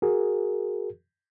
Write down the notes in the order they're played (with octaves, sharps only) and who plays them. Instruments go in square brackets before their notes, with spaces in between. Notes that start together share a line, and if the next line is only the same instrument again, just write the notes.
[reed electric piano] F#4 G#4 A#4